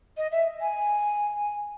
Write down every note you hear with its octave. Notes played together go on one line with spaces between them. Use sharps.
D#5
E5
G#5